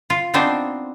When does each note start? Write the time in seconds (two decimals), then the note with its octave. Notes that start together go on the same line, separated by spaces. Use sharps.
0.10 F4
0.34 B3 C4 D4 D#4 C5